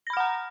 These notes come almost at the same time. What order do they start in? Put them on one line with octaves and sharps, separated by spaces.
A#6 B5 F6 F#5 A#5